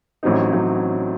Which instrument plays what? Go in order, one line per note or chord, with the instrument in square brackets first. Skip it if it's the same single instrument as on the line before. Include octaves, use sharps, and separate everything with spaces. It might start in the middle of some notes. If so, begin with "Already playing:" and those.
[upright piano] A1 A2 F#3 C4 D#4
A1 A2 F#3 C4 D#4